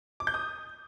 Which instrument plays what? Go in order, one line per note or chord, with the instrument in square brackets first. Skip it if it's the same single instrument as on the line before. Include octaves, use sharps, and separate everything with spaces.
[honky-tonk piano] D6
G6
D#6